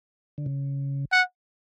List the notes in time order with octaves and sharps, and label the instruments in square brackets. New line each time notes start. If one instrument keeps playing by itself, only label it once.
[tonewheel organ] D3
C#3
[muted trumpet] F#5